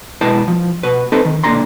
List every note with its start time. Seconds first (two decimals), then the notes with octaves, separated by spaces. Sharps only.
0.21 B2 G#3 E4 B4 G5 A5
0.48 F3
0.83 B2 B4
1.12 C4 D#4 A4 B4
1.25 D#3
1.44 B1 A#2 D3 A#5 C6